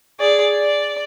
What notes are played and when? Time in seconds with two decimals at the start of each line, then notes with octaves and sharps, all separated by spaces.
0.20 G#4 D5
0.56 D5